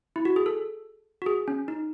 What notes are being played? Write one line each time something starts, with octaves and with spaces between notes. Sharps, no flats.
E4
F#4
G#4
A4
F#4
G#4
C#4
D#4